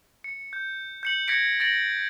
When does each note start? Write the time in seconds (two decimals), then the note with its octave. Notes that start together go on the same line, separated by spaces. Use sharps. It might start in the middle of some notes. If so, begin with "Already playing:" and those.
0.24 C#7
0.53 G6
1.03 G6 C#7 F#7
1.28 G#6 A#6 B6 C#7 D7
1.60 A6 A#6 D7 F#7